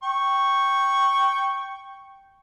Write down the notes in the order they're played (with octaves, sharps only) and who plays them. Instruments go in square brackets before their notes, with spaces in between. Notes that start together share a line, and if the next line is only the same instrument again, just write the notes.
[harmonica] G5 C#6